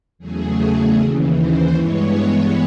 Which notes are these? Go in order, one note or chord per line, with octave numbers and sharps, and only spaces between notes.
E2 C#3 F#3 A3 G#4
D#2 C#3 E3
C5
G2 E3 G#3 B3 C#5